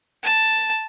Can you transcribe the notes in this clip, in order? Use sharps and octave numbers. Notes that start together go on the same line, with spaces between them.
A5